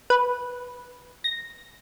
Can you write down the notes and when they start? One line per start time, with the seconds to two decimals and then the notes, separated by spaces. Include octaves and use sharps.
0.10 B4
1.24 A#6